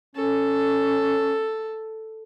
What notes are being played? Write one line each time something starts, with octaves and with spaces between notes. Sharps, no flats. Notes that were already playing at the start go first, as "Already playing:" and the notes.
C#4 A4